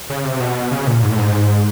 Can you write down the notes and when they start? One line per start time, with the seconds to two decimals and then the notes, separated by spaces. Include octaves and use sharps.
0.10 C#3
0.25 C3
0.40 B2
0.71 C#3
0.87 A#2
1.03 G#2
1.10 A2
1.18 G#2